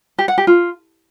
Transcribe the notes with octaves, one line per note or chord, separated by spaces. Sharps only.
G4
F#5
G4
F4